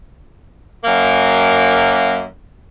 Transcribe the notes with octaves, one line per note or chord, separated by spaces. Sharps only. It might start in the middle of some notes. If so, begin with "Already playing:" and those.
F#2 A#3